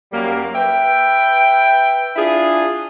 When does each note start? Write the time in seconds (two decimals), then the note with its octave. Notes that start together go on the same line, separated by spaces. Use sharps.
0.12 F#2 G3 A#3
0.54 B4 E5 G5
2.16 D4 E4 F4 G#4